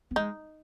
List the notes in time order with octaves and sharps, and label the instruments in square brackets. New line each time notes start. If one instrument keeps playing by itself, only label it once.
[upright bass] B3
[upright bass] G#3 [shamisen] D#4